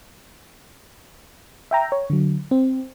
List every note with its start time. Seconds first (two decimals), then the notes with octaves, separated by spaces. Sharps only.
1.71 E5 G5 A#5
1.92 C#5
2.10 D3 F#3
2.51 C4